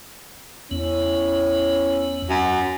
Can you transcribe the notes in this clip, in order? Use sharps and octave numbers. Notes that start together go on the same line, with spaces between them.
E2 B3 C#4 E4
F#2